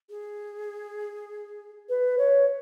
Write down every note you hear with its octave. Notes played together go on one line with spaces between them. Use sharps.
G#4
B4
C#5